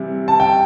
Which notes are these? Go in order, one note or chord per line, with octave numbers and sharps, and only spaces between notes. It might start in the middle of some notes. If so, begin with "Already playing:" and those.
Already playing: C3 E3 G3
A5
G5